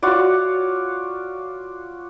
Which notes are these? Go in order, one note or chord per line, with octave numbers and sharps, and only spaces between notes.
F4 F#4 C#5 D5